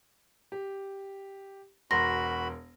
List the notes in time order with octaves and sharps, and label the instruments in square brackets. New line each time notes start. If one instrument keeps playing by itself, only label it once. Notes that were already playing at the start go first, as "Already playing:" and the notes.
[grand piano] G4
[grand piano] E1 A#4 C6 [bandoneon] F#4 B5 [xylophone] A#6